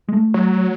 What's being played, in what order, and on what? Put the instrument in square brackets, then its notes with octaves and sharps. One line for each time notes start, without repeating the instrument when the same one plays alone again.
[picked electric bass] G#3
A3
[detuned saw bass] F#3